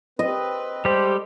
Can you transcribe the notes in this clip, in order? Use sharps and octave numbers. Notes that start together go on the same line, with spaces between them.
C4 B4 D#5
G3 G#3 G4 A4 C5